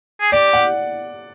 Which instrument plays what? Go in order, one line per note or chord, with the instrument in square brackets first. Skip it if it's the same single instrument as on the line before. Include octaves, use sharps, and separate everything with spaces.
[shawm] G#4
[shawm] G4 [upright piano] D5
[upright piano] F#5